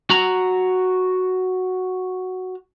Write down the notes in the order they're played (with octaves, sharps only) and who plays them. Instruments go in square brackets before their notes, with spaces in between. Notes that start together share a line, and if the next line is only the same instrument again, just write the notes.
[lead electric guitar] F#4 A#5